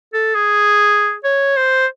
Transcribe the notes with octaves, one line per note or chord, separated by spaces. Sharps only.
A4
G#4
C#5
C5